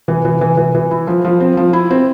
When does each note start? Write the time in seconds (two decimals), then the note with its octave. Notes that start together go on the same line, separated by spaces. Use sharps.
0.08 E3
0.25 E3
0.41 E3
0.57 E3
0.75 E3
0.91 E4
1.07 F3
1.25 F3
1.40 C4
1.57 F3
1.73 E4
1.91 C4